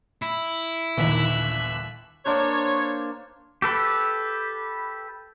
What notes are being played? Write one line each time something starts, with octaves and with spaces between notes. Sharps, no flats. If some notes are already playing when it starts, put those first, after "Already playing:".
E4
G1 D#2 A#2 D#3 E3 E5 F#6
A#3 D4 C5 C#5
G4 A4 B4